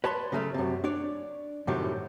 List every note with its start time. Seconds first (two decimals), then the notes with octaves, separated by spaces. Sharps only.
0.04 B4 C#5 D5 A5 B5 C6
0.32 C#3 F#3 A3 C#4
0.54 F#2 C3
0.84 D4 C#5 D5
1.67 F#2 A2 C3 D#3 F#3 G3